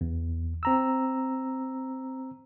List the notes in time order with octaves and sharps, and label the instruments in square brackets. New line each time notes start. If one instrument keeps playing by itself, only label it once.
[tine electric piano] E2
C4 A#5 E6